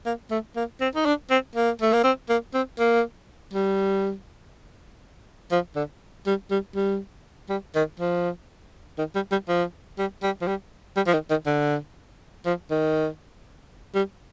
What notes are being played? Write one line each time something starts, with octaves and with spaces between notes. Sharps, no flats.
A#3
A3
A#3
C4
D#4
D4
C4
A#3
A3
A#3
C4
A#3
C4
A#3
G3
F3
D3
G3
G3
G3
G3
D#3
F3
D#3
G3
G3
F3
G3
G3
F3
G3
G3
F3
D#3
D#3
D3
F3
D#3
G3